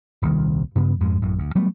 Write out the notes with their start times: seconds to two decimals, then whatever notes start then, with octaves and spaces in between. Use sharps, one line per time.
0.22 D#1 C2 A#2 D#3
0.75 G2 C#3 B3
1.00 F2 G#2 G#3
1.21 A1 F#2 A2
1.38 D2
1.55 F#3 G3 A3 B3